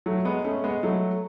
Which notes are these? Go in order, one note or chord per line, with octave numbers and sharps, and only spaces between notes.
F#3 A3
G#3 B3
A3 C#4
G#3 B3
F#3 A3